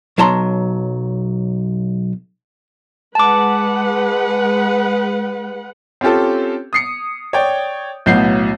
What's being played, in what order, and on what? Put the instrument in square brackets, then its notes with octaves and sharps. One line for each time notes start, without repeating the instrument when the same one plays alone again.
[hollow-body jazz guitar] B1 F#3 A5 A#5 C6
[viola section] G#3 B4 F#5 [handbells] A5 D6
[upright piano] C4 C#4 F4 G4 A4
D#6 C7 C#7
C#5 D5 G5
B1 A2 F#3 B3 G6 C7